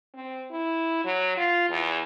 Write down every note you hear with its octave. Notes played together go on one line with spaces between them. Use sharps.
C4
E4
F#3
F4
E2